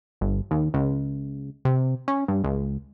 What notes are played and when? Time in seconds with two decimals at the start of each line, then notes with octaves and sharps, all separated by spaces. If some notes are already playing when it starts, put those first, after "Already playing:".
0.21 G1
0.51 D#2
0.74 C#2
1.65 C3
2.08 C#4
2.28 G2
2.44 C#2